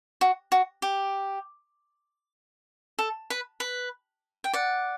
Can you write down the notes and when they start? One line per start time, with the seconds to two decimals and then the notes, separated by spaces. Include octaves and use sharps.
0.21 F#4
0.52 F#4
0.82 G4
2.99 A4
3.30 B4
3.60 B4
4.44 G5
4.54 D5 F#5